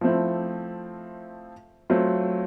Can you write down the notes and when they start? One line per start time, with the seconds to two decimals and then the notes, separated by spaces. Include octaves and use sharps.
0.01 F3 A3 C4 E4
1.90 F#3 A3 C4 F4